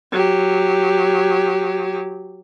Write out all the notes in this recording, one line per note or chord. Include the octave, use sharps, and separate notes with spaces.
F#3 G4